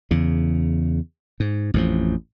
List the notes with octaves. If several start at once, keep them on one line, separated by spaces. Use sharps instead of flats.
E2 C#3
G#2
A1 F2 D3 F3